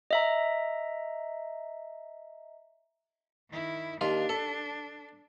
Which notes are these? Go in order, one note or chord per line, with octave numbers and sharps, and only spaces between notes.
D#5 E5 A#5
D#3 E4
D#2 D4 F4
A4